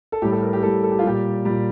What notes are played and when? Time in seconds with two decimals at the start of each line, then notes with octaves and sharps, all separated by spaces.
0.12 A4
0.22 A2 G4
0.25 G3
0.32 A4
0.42 A#4
0.53 G4
0.63 A2 G3 A4
0.83 A4
0.91 G4
0.99 F4
1.04 A#2 G3 G4
1.45 A#2 G3